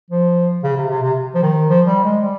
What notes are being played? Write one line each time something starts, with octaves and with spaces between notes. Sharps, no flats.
F3
C#3
C3
C3
C3
F3
D#3
F3
G3
G#3
G3